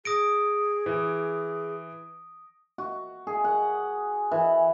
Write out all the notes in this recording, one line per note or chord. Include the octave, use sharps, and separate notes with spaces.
G#4 D#6 A#6 D7
E3
F#4
G#4
F#5
E3